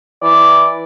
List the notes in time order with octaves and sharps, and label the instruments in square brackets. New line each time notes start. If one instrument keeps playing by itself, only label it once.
[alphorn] E3 [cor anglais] D5